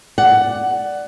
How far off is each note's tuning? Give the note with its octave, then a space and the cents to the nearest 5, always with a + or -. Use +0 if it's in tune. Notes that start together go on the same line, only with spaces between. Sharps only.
D5 +0 F#5 +15